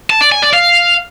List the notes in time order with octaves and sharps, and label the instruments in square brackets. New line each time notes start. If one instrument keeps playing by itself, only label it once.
[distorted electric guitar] A5
D5
G#5
D5
F5